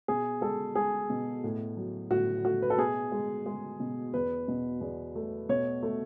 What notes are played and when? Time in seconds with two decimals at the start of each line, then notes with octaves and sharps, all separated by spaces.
0.08 B2 G#4
0.41 G#3 A4
0.75 G#3 G#4
1.10 B2
1.44 A2
1.77 F#3
2.11 A2 F#4
2.45 A3 F#4
2.62 B4
2.70 A4
2.78 B2 G#4
3.12 G#3
3.46 G#3
3.80 B2
4.14 E2 B4
4.48 B2
4.81 E2
5.15 A3
5.49 B2 C#5
5.83 A3